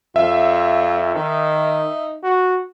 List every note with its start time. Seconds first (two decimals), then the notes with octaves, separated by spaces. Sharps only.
0.16 F2 F4 E5
1.15 D#3 D#4
2.23 F#4